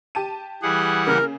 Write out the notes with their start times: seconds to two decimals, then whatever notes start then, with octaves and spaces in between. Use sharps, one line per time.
0.15 G4 A5 D#7
0.63 E3 G3 G#4 F#5
1.07 C#3 A#3 A#4